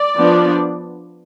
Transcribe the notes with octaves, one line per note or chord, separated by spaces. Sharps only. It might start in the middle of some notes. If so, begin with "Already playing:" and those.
Already playing: D5
F3 B3 D4